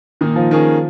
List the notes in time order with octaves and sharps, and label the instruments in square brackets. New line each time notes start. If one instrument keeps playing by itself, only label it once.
[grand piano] A#2 A#3 D#4 [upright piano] D#3
[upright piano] F3
[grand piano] D#3 A#3 C#4 G#4